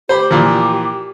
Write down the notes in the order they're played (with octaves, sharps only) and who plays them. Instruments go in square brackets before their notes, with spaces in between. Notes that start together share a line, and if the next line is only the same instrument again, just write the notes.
[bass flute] G4 [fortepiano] C5 B5
[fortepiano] A#2 E3 F3